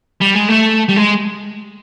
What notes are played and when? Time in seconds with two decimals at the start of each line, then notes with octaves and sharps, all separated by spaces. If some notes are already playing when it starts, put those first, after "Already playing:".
0.21 G3
0.36 G#3
0.50 A3
0.89 G3
0.97 G#3